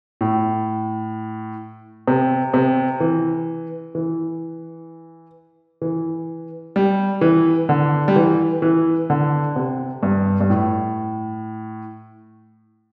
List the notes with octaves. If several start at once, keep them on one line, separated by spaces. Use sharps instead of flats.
A2
C3
C3
E3
E3
E3
G3
E3
D3
G3
E3
E3
D3
C3
G2
G2
A2